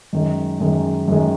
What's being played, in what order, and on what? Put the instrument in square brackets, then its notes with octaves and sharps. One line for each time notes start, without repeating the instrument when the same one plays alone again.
[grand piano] F#2 D#3 G#3
F#2 D#3 G#3
F#2 D#3 G#3